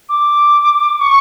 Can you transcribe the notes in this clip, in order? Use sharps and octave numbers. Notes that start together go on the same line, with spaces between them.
D6
C#6